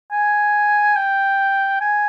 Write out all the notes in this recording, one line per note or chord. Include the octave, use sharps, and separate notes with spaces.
G#5
G5
G#5